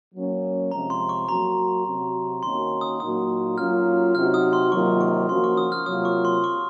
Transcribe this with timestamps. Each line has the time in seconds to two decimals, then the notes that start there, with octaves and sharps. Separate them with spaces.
0.14 F#3 A#3 C#4
0.71 C3 F3 G#3 C4 A#5
0.90 C6
1.09 C#6
1.28 F#3 A#3 C#4 F#4 A#5
1.86 C3 F#3 C4 F#4
2.43 D#3 A#3 C#4 F#4 C6
2.81 D#6
3.00 A#2 F#3 A#3 D#4 F#4 D#6
3.58 F#3 A#3 C#4 F4 F6
4.15 C3 F#3 C4 D#4 F#4 F6
4.34 D#6
4.53 C6
4.72 C3 D#3 F#3 A#3 F4 C#6
5.01 C#6
5.29 F3 A#3 C#4 F#4 C6
5.44 C#6
5.57 D#6
5.72 F6
5.86 C3 F#3 A#3 F4 D#6
6.05 C#6
6.25 C6
6.44 C#6